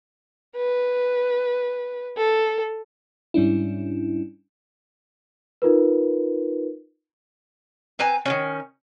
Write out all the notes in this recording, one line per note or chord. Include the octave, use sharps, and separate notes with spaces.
B4
A4
G#2 G3 C#4 D4 E4
D#4 F4 A#4 B4
C4 B4 G#5 A#5
D#3 E3 C#4